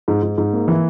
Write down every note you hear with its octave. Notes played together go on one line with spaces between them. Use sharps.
G#2
G#2
G#2
A#3
E3